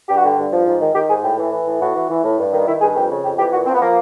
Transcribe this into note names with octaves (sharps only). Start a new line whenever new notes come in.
G2 G4
F#4
D3 G4
G2
F3
G#2
D#3
D#3 G4
G#2 G#4
A2 G4
E3
E3
A2
A2 F#4
E3
E3
A2
G2
D#3
D#3 E4
G2 G#4
F2 G4
C#3
F2 G4
E3 G4
A#2 F#4
F3 C4
B3
F3 A#3